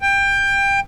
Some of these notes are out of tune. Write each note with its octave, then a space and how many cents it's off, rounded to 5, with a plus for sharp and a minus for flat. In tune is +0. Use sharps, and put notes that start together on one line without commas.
G5 +20